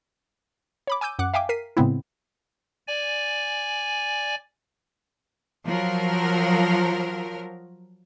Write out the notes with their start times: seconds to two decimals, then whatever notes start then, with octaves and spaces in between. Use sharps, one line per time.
0.87 C#5 B5 D6
1.01 G#5 D6 E6 G6 D#7
1.19 F#2 F#5 D6 F#6
1.34 E5 F5 G5 G#5 D6
1.49 A#4 B6 C7 D#7
1.77 A2 C#3 G#3 B3 C4 E4
2.87 D5 G#5
5.66 F3 F#3 A#4